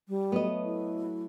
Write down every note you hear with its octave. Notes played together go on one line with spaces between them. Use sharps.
G3
F#3 A3 B3 D#5
E4